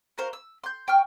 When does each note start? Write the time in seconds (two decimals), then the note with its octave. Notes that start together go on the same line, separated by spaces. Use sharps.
0.18 F#4 A#4 C5 F5
0.33 E6
0.64 C6 G6
0.88 G5 C#6 F6